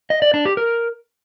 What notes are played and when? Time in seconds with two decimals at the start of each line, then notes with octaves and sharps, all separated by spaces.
0.10 D#5
0.22 D5
0.34 D4
0.45 G4
0.57 A#4